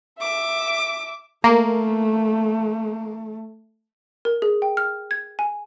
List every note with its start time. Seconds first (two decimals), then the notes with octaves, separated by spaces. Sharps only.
0.19 E5 D6
1.44 A3 A#3
4.25 A#4
4.42 G#4
4.62 G5
4.77 F6
5.11 G#6
5.39 G#5